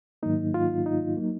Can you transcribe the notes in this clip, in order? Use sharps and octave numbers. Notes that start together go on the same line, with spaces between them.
G#2 D#3 F#3 A#3 D#4
F4
D#4
F#3 A#3